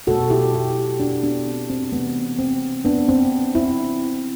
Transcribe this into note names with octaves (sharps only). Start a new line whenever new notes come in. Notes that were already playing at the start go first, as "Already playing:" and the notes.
B2 A3 F#4 A4
E4 G4
E4 G4
D4 F#4
B3 D4
C4
C4
C3 E3 A3 B3
C4
B3 D4
C4
C4 E4